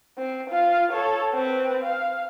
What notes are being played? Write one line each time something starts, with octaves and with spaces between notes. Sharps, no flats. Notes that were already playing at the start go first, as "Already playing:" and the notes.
C4
F4 F5
A4 C#5
C4 B4
F5